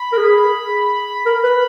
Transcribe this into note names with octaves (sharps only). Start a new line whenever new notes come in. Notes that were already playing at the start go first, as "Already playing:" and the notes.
Already playing: B5
A#4
G#4
A#4
B4